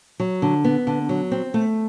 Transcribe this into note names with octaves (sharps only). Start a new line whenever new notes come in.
F#3
D3
B3
D3
F#3
C4
A3